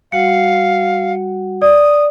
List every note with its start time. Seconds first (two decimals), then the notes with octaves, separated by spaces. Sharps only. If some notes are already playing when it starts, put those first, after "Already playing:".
0.12 G3 F#4 F5 F#5 C#7
1.62 D5 D#6